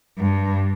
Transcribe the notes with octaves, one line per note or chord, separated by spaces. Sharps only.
G2